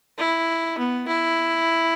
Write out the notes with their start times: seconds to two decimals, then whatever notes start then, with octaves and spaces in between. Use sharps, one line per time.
0.18 E4
0.78 B3
1.08 E4